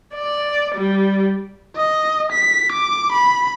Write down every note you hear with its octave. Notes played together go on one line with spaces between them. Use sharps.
D5
G3
D#5
B6
D6
B5